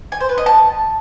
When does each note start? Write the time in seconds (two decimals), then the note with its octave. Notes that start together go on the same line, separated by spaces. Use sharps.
0.12 G#5
0.21 C5
0.29 B4
0.38 D#5
0.46 A5